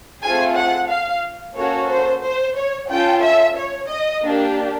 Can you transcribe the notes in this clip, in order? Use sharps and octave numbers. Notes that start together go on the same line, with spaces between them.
A3 C4 F4 G#4 G#5
F#5
F5
A#3 C#4 F#4 A4 C#5
C5
C5
C#5
C#4 F4 A4 G5
E5
C#5
D#5
A#3 D4 G4